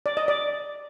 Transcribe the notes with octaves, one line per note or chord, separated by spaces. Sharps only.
D5
D#5
D5